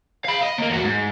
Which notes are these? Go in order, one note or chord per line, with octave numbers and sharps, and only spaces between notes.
F5 B5
D#5
A#3 A#4
E2 F#4
G#2